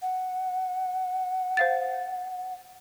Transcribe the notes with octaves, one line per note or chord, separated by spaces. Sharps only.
F#5
C5 F5 A6